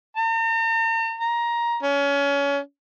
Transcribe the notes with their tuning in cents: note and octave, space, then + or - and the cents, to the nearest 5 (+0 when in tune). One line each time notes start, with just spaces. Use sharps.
A#5 -45
A#5 +15
C#4 +25